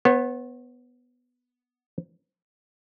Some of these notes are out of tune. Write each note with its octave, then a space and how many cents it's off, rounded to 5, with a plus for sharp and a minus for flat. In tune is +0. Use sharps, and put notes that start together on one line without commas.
B3 +0 C#5 -45